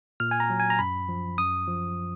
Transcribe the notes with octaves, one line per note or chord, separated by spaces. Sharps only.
A#2 F6
G#5
A#5
F#3
G#5
A#5
F#2 B5
F3
F#2 D#6
F3